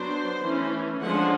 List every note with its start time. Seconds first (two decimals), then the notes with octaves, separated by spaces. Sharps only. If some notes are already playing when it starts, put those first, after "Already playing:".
Already playing: F#3 B3 D4 C5
0.42 E3 A3 C#4
1.00 D3 F3 G#3 C#4 F#5